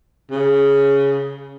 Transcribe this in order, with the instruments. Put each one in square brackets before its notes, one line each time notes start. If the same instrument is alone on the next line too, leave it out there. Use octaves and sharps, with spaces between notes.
[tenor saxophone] C#3